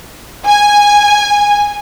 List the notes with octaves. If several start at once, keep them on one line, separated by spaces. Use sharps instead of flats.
G#5